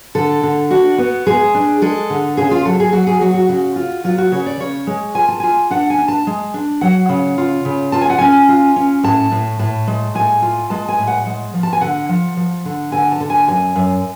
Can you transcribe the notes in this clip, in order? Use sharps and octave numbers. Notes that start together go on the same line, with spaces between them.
D3 A4
D3
D4 F#4
B3
G#3 G#4
D4
G#3 A4
D3
C#3 G#4
F4
F#3 A4
G#4
F#3 F#4
G#4
F#3 F#4
F#4
C#3 F#4
F4
F#3 F4
F#4
C#3 C#5
D5
C#3 C#5
G#3
F4 G#5
A5
F4 G#5
D4 F#5
G#5
D4
A5
G#3
D4
F#3 F#5
C#3
F4
C#3
F4 A5
G#5
F#5
C#4 G#5
F4
C#4
A2 A5
A2
A2 A5
G#3
A2 G#5
F4
G#3 A5
G#5
A2
F#5
G#3
F3
A5
G#5
D3 F#5
F3
F3
D3
D3 G#5
A5
D3
G#5
F#2 G#5
F#2